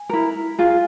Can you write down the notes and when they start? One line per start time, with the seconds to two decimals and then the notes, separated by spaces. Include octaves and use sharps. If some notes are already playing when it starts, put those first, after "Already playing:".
Already playing: G#5
0.09 E4 A#4
0.59 F4 G#4